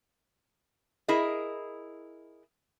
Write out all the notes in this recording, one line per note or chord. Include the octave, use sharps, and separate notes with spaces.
E4 G#4 A#4 D#5